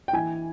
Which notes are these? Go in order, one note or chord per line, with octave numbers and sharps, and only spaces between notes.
G5
E3 G#5